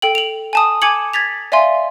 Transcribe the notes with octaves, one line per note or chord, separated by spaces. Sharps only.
A4 G5 F#7
F7 F#7
G#5 A5 D#6
G#5 D6 G#6 C#7 F#7
G#6 A6 B6 F7
D5 E5 F5 G#5 C6